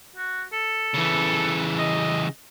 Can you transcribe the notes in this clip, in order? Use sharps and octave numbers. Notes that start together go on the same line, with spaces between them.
F#4
A4
C#3 E3
D#5